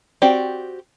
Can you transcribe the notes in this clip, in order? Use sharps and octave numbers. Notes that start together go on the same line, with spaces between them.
C4 F#4 G4 D5